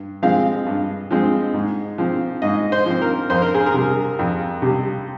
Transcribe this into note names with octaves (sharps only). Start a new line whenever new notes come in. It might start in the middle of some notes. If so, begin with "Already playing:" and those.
Already playing: G2
F3 G#3 C4 F5
G2
F3 G#3 C4
G#2
F3 C4
G#2 D#5
C5
F3 C4
A#4
F2 C5
A#4
G#4
A#4
C3 G3
F2
C3 G3